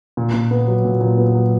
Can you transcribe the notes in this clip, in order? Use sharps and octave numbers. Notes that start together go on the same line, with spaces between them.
A#2
A#2
B3
F#3
A#2
A#2
B3
F#3